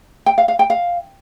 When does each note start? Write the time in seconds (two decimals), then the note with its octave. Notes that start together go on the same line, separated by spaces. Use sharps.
0.26 G5
0.38 F5
0.48 F5
0.59 G5
0.70 F5